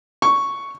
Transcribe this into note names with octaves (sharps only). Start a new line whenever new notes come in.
C#6